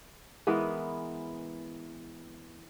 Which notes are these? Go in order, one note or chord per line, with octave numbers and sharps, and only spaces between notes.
E3 G#3 B3 A#4